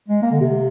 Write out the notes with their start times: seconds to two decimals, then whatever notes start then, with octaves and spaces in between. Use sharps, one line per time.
0.08 G#3
0.22 A#3
0.31 D3
0.41 C3